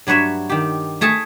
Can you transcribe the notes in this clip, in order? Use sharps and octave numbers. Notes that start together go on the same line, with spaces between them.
G2 F#3 B4 C#5 E5
D#3 G4
A3 G#4 A4 E5 A5